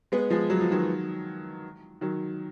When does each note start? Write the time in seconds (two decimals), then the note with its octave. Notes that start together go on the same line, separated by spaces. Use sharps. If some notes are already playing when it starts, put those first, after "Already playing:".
0.12 G#3 B3
0.30 F3 G#3
0.50 F#3
0.61 F3
0.71 D#3 F#3
2.01 D#3 F#3